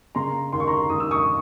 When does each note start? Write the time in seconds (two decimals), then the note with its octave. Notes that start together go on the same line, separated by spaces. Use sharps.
0.15 C#3 A#5 C6
0.52 D#2 C6
0.60 C#6
0.67 A#5 C6
0.90 D#2 D#6
1.00 E6
1.11 C#6 D#6